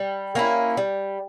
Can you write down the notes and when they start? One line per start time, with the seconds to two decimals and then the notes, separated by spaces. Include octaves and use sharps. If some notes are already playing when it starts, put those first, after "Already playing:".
Already playing: G3
0.35 A#3 C#4 E4
0.77 G3